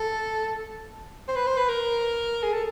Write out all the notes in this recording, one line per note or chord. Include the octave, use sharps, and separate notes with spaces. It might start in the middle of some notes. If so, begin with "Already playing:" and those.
Already playing: A4
C5
B4
C5
B4
A#4
G#4
A4